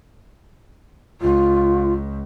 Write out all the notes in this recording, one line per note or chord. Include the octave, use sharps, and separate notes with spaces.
C#2 F4